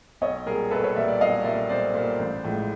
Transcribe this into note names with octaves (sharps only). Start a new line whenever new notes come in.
B1 C#5 D#5
A#2 G3 G#4 A#4
B1 A4 B4
B4 C#5
A#2 G3 D5 E5
D5 E5
B1 D#5 F5
A#2 G3 D5 E5
B1 C5 D5
A#2 G3
A1
A2 F3 G#3